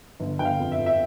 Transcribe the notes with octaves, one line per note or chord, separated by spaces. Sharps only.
G1
G1 G5
F5
F2
E5
F2
E5